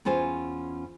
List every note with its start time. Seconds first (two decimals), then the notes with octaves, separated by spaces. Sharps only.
0.05 E2 C#4 F4 C5 G#5